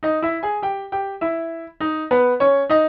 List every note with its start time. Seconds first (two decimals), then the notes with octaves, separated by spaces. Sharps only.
0.03 D#4 D#5
0.22 E4 E5
0.43 G#4 G#5
0.62 G4 G5
0.92 G4 G5
1.21 E4 E5
1.80 D#4 D#5
2.11 B3 B4
2.40 C#4 C#5
2.69 D#4 D#5